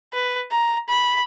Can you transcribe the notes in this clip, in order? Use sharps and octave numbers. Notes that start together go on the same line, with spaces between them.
B4
A#5
B5